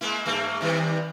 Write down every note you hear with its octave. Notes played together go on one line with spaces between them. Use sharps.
G#3 A#3 E4
G2 A3 A#3
C3 D#3 G3